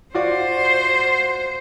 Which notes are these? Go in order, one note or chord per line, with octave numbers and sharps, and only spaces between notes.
F4 F#4 C5 D5